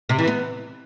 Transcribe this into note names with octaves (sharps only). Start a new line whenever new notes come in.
C3
E3
B3